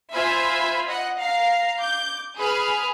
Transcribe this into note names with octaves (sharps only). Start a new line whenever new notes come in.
F4 C5 E5 G#5 B5
D#5 F#5
F5 A#5 C7
D6 G6
G#4 B4 B5 F6